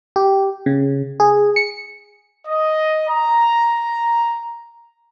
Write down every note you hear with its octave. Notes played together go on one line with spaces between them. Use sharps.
G4
C#3
G#4
C#7
D#5
A#5